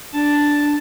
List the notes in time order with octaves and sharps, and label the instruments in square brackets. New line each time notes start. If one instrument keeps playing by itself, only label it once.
[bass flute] D4 [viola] A5